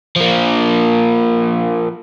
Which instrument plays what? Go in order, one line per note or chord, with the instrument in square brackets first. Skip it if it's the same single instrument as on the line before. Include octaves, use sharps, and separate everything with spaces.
[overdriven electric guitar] F3 A#3